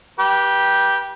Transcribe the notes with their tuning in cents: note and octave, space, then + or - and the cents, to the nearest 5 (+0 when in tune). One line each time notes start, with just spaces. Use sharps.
G4 +0 B4 -40